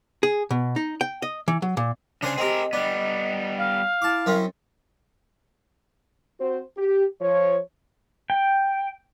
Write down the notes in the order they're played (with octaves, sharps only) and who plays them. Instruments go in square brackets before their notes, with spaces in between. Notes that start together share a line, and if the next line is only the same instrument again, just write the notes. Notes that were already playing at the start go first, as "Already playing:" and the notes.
[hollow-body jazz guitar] G#4
B2
D#4
G5
D#5
E3
F#3
A#2
[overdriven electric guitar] C#3 G#4 [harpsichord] D4 C5 G#5
[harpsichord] C4 G4 [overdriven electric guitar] G#4 A#4 [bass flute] D#5
[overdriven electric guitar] G3 B3 [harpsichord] D4
[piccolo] F5
[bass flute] E4 [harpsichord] A5 D6
[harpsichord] F#2 C4 C#4
[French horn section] C4 F#4 C5
G4
F3 C#5
[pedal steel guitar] G5